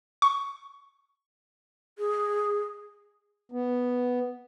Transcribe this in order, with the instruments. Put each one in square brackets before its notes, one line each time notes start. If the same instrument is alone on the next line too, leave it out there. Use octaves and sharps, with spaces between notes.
[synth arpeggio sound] C#6
[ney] G#4
[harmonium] B3